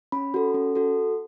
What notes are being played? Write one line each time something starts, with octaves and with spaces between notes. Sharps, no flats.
C#4 B5
F#4 A4
C#4
F#4 A4